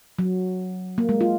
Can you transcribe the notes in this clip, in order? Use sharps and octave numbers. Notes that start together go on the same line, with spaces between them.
F#3
A#3
G#3
F4